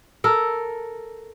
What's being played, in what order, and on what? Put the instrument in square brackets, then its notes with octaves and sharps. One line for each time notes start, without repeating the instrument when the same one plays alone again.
[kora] A4 A#4